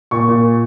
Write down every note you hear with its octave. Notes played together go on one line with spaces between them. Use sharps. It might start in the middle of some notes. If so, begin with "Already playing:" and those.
A#2 C#6
A#2